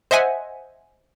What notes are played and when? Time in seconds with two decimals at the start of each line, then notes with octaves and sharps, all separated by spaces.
0.11 C5 D#5 E5 F#5 G#5